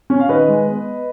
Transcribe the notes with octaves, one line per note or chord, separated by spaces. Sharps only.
C#4
F5
D#3 B4 D#5
G#3
B3